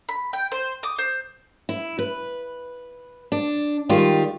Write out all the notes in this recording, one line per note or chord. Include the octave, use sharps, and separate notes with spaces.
B5
G5
C5
D6 D#6
C5
E4
B4
D4
D#3 G3 G#3 F4